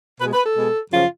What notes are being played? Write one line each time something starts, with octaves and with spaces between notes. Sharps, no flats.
B2 G#3 B4
B4
A4
B2 G#3
F#2 C#3 F3 F4